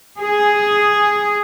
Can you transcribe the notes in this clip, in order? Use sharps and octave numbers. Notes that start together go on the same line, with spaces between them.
G#4